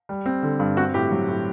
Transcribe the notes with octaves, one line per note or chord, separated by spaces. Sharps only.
G3
C4
D3
G2
C4 F#4
A2 G4
F#3
A2